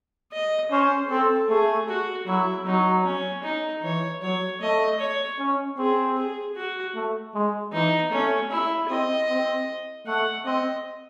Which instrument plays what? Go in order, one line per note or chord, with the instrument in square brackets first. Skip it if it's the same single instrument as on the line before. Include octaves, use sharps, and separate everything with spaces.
[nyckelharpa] D#5
[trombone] C#4 [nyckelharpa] C5
[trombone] C4 [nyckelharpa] A4
[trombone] A3 [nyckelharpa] G#4
[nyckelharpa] F#4
[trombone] F#3 [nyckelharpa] E4
[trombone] F#3 [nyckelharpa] D#4
[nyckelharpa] C#4
D#4
[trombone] E3 [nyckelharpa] C#5
[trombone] F#3 [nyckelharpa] C#5
[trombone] A3 [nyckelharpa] D#5
[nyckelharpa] C#5
[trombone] C#4
[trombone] C4 [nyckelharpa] G#4
[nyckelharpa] G#4
F#4
[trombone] A3
G#3
[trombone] E3 [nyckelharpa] D#4
[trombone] A3 [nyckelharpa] C#4
[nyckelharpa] E4
[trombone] C4 [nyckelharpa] D#5
[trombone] C4
[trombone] A3 [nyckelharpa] F#5
[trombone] C4 [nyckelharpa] D#5